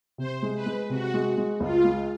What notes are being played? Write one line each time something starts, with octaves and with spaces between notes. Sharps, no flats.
C3 C5
G#3
B4
G#3
C3 F#4
G#3
G#3
C#2 F4
G#3